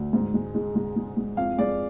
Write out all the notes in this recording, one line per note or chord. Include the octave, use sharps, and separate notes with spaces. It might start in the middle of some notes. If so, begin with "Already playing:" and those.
Already playing: D2
G#2
G#3
G#3
G#3
G#3
G#3
F2 F5
G#3 D5